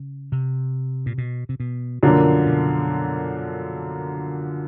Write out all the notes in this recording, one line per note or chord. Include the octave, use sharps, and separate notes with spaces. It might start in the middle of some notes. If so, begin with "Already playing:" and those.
Already playing: C#3
C3
A#2
B2
C3
B2
F#2 B2 D3 F3 A#3 D4
B2